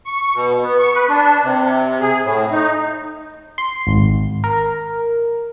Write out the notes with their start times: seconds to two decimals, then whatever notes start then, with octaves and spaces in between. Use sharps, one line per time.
0.06 C#6
0.35 B2
0.63 B3
0.80 C#6
0.95 B4
1.09 D4
1.44 C3
2.01 G#4
2.24 A2
2.52 D#4
3.58 C6
3.87 G#1
4.44 A#4